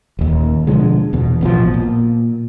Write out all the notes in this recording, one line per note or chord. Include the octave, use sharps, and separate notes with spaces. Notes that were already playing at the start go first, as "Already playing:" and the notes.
D#1 D#2
B2 D3 F3 G#3
E2 B2
A1 B2 D#3 F3
A#2